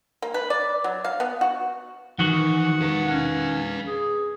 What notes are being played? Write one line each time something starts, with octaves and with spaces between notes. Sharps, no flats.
A#3
B4
D5
F#3
F5
B3
F#4
D#3 E3 F#4 F#5
B4 F5
C#4
G#4